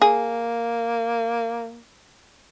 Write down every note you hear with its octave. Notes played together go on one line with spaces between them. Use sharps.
A#3 G#4